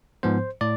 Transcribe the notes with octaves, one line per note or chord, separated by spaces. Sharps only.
G#2 F3 B3 C5
A2 D5